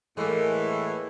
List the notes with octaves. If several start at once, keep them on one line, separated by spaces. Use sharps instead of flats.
A2 E3 G#3 A#3